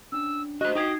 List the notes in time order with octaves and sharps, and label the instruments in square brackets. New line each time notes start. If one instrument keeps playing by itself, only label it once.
[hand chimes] C#4 D4 [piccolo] E6
[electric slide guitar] F#4 C5 [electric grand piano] D#5 [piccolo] F#6
[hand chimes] D#4 G#6 C7 [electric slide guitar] F#4 G5 [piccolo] D#6